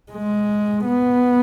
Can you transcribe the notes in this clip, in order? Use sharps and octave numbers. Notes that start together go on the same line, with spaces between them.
G#3
B3